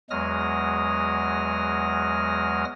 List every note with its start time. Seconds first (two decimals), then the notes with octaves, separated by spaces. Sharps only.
0.10 E2 F#3 G#3 D#6 F6 A#6